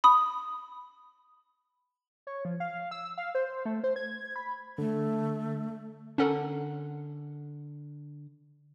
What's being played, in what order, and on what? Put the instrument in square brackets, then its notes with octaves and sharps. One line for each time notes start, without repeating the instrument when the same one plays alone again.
[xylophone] B5 D#6
[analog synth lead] C#5
F3
F5
E6
F5
C5
A3
C5
G#6
B5
[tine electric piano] D3 [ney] A3
[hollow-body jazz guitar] D3 F#5 [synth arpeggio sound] C#4 A4 A#4